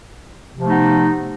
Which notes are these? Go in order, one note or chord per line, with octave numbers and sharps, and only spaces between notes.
C3 F3 A3 B3 D#4